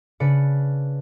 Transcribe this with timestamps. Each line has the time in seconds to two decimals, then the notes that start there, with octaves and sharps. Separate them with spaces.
0.20 C#3 D4 B4 D5 C#7